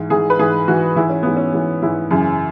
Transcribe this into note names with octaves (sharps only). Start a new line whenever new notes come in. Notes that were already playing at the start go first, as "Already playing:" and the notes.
Already playing: G#2 E3
G#2 E3 G#4
B4
G#2 E3 G#4
G#2 E3 F#4
G#2 E3 E4
C#4
G#2 E3 B3
C#4
G#2 E3
G#2 E3 E4
F#2 C#3 E3